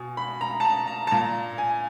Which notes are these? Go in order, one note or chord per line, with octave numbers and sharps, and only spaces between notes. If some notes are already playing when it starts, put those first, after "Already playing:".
Already playing: B2 G#5
B5
A#5
A5
A#5
A#5
A5
A#2 A#5
G#5